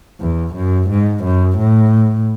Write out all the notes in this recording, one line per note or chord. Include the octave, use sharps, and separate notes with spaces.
E2
F#2
G#2
F#2
A2